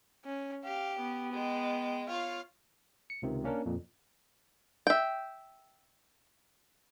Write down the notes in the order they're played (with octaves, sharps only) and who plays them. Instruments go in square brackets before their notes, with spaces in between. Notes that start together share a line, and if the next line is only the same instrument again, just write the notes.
[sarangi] C#4
[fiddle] G4 [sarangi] F5
[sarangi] B3
[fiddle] G#3 G5
[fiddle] F4 C#5 [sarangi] F5
[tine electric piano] C#7
C#2 C3 D#3
A#3 C#4 D4 A#4
F2 A#2
[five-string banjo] E5 G5